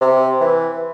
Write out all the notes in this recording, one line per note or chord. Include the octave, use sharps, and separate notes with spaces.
C3
E3